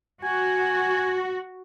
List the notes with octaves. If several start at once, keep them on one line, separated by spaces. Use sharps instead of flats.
F#4 G#5